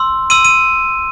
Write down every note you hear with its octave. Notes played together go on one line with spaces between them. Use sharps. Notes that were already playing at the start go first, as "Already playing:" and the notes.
Already playing: C6 E6
C6 E6 D#7
D#7